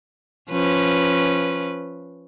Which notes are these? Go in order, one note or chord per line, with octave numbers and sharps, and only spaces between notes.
F3 C#4 B4